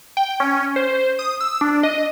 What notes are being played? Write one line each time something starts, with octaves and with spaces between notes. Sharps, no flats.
G5
C#4
C5
D#6
E6
D4
D#5